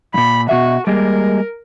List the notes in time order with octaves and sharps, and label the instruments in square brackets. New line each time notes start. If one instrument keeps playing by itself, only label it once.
[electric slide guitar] G2 A#2 [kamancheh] B5
[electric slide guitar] B2 E3 E5 [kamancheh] F#4
[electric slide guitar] G3 G#3 A#3 [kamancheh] A#4